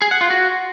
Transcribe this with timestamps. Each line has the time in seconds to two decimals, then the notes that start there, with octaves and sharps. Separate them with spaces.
0.02 G#4
0.11 F#5
0.21 F4
0.30 F#4